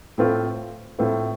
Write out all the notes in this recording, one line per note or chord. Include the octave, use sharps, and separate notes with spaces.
A2 A3 C4 F4
A2 A3 C4 F4